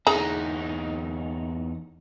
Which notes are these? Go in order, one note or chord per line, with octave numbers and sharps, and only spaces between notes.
E2 D#4 G#4 A#5